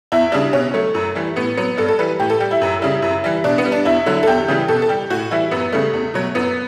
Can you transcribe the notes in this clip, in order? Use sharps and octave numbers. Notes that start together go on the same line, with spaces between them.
E2 E4
C#3 G3 D4
B2 C#4
F#3 A3
F#2
E3 G3
A2 B3
F#3 B3
G2 A4
A4
E3 G3 B4
A2 G4
A4
G3 G4
E4
F#2
C#3 G3
F#2
E3 G3
B2 D4
B3
G3
D4
E2 E4
D3 F#3
A4
E2 G4
C#3 E3 G3
B2 A4
A4
G3 G4
A2 F#4
E3 G3 E4
F#2 B3
C#3 G3 A3
E2
B2 F#3
F#2 B3